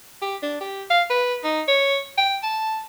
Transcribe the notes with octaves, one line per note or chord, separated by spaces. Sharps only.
G4
D4
G4
F5
B4
D#4
C#5
G5
A5